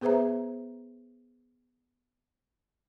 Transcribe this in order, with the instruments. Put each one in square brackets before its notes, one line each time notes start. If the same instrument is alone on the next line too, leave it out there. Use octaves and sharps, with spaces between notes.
[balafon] B3 G#4 B4 C5 E5 A#5